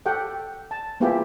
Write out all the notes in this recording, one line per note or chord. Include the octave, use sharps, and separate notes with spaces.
G4 A4 F#5 G5
A5
A#3 B3 E4 F4 G4 G#4